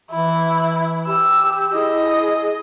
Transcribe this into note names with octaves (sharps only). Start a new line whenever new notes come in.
E3 E4
G4 E6
E4 G#4 D#5